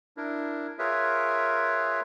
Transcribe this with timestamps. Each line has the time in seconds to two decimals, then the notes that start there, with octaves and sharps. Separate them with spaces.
0.17 D4 E4 A#4
0.79 F4 G#4 A#4 B4 C#5 E5